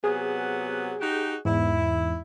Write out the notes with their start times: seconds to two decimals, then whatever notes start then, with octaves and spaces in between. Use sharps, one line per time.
0.04 C3 F#3 B3 G#4
1.01 D#4 F#4 G4
1.45 E2 G#2 E4